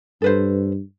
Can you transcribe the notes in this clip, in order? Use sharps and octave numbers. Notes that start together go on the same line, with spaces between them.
G2 A4 B4 C5